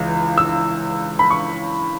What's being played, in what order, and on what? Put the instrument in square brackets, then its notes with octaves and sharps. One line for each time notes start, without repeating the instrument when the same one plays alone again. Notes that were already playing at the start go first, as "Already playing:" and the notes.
Already playing: [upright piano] C#2 C#3 E3
E6
B5
C#6